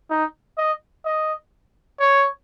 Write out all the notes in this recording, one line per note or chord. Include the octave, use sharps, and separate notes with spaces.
D#4
D#5
D#5
C#5